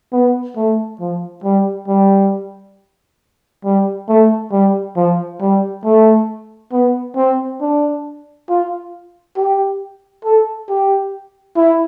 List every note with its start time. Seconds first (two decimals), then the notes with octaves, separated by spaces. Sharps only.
0.12 B3
0.56 A3
1.00 F3
1.44 G3
1.88 G3
3.65 G3
4.09 A3
4.52 G3
4.96 F3
5.41 G3
5.85 A3
6.72 B3
7.17 C4
7.61 D4
8.49 F4
9.37 G4
10.25 A4
10.69 G4
11.56 E4